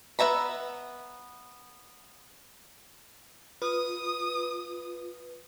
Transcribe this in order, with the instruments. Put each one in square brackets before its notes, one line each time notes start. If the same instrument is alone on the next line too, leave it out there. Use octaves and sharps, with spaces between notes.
[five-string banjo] B3 B4 E5 A#5 B5
[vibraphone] F4 [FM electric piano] B4 [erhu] D#6